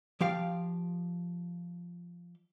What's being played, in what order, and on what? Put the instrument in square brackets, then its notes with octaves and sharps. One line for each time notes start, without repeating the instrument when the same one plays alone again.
[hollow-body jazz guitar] F3 G4 F5